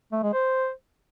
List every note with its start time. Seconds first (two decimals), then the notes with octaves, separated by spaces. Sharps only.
0.12 A3
0.23 G#3
0.33 C5